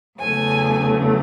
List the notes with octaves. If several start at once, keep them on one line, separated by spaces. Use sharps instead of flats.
E2 C#3 F#3 A3 G#5